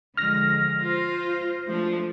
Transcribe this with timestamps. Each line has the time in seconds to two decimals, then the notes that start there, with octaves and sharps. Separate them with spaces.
0.17 D3 F3 G#3 F6 A#6
0.81 F4 C5
1.68 F3 A3 D4